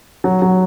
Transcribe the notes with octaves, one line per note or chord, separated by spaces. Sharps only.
F#3
F#3